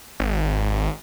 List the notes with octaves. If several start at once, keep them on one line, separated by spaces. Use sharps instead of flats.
G#1